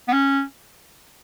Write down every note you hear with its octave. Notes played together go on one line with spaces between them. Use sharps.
B3
C#4